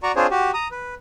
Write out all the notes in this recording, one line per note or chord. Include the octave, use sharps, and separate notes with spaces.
F#4 D5 A#5 C#6
C4 D4 F4 G#4 C5 C#5
F#4 G4
A#5 D#6
B4